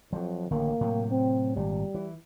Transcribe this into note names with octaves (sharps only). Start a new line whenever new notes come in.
F2 F3 F#3
A1 D3 D#3 A#3
A2 C3 F#3
C4
G#1 A#2 G3
E3